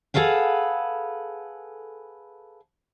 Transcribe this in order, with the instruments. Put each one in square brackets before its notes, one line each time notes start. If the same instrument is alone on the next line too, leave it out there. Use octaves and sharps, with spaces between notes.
[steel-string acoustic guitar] G#4 A4 B4 F5 F#5